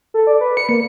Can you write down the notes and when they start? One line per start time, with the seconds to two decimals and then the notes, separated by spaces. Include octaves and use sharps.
0.14 A4
0.27 D5
0.41 B4
0.57 C#7
0.69 A#3